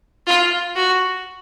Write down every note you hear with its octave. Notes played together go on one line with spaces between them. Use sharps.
F4
F#4